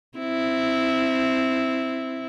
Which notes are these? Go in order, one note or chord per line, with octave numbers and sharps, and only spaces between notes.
C4 E4